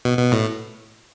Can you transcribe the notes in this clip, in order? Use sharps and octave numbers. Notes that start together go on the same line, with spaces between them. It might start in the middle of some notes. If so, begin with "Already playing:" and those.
B2
B2
A2